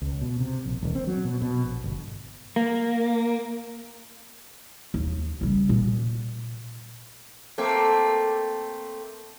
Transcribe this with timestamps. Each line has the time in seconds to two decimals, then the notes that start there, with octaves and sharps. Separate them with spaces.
0.02 C#2
0.22 B2
0.40 C3
0.66 A#1
0.82 D#1
0.95 C4
1.07 F#3
1.24 B2
1.42 B2
1.64 A#1
1.84 G1
2.56 A#3
4.94 D#2
5.41 C#3 G3
5.69 A#2
7.58 A3 A#3 C4